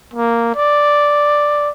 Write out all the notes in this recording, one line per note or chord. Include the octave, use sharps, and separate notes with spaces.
A#3
D5